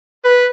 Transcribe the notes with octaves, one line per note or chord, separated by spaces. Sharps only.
B4